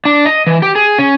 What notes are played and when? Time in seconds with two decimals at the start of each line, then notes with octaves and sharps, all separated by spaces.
0.05 D4
0.25 D#5
0.47 E3
0.62 G4
0.75 G#4
0.99 C#4